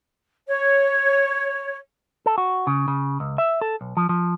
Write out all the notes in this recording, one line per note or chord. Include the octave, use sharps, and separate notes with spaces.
C#5
A4
F#4
C#3
C#3
C#2
E5
A4
B1
F3
F3